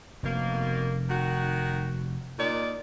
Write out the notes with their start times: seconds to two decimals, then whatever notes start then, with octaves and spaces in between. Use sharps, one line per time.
0.23 F1 B2 A#3
1.09 D#3 F#4
2.38 A#2 D#4 D5